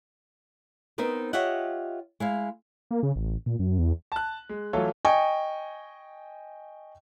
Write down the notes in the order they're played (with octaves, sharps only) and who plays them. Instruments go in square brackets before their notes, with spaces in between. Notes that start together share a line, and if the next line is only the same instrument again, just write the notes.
[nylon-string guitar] B3 C4 D#4 A#4 C5
F4 G4 C#5 D#5 E5 F#5
G#3 E4 F5
[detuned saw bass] A#3
C#3
A1
A#2
F#2
E2
[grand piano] A5 F#6
G#3
E3 F#3 A3 F4 A4 C#5
[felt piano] D#5 G5 G#5 C#6